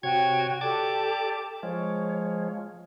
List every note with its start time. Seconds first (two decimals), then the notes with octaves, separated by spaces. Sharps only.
0.03 C3 F#4 C#5 G5 G#6
0.61 G4 A4 D5 A5 D6
1.63 F3 G#3 C#5